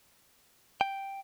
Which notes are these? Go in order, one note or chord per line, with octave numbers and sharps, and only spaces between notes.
G5